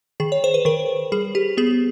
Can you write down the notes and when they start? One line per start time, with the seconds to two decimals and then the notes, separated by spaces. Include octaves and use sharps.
0.20 D#3 G#4
0.32 C#5
0.44 C5
0.54 B4
0.65 D#3 A#4
1.12 G3 G#4
1.35 G4
1.57 B3 G#4